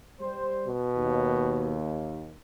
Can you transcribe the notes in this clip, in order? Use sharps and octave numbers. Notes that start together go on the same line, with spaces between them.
G3 C5
B2
D#2